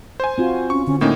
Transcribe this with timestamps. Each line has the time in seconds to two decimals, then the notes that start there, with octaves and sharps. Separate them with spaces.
0.20 C5 G#5
0.38 C4 F4 F#4
0.70 C#4 C#6
0.87 D3 C#4
1.01 A2 A#3 C#4 D#4